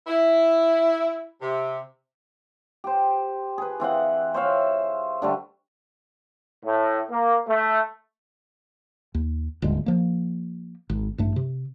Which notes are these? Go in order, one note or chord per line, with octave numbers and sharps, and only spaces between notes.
E4
C3
G4 C5
G#4 B4
E3 C4 F5 F#5
C5 C#5 E5 F5
D3 G3 A3
A2
A#3
A3
D#2
D#1 D2 G#2 G#3
F3 A#3
G#1
A1 G2 A3
C3